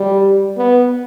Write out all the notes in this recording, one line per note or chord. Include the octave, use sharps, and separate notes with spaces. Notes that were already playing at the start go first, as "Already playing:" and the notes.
Already playing: G3
B3